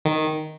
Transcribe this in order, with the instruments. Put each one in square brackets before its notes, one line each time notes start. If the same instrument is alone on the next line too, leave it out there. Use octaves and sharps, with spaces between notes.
[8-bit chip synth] D#3